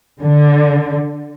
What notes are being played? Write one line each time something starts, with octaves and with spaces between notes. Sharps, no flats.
D3